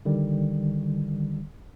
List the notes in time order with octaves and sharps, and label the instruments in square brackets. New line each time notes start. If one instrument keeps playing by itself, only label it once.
[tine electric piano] D3 D#3 G3